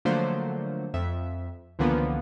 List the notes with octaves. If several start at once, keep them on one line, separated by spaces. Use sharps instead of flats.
D3 F3 F#3 A3 A#3 C5
F2 E5
C#2 D3 E3 F3 A#3 B3